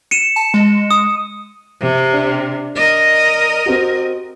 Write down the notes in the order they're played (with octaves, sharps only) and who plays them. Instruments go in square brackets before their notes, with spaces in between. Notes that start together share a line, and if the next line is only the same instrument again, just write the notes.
[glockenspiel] C#7 D#7 E7
[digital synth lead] A5
G#3
[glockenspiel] D#6
[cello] C3
[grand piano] D4
[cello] A#4 D#5
[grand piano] C4 F#4 G4